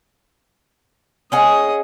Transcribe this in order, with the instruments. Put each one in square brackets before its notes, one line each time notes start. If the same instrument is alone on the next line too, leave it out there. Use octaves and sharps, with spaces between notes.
[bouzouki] C#4 G#4 F#5 [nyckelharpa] D#5 D#6